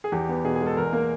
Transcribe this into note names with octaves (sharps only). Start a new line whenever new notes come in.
G#4
E2 G4
B3
B2 G#4
G#4
G#3
A4
E2 A#4
A#3